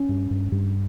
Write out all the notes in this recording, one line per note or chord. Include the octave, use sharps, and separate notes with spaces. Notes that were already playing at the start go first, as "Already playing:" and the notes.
Already playing: C#4
G2
G2
G2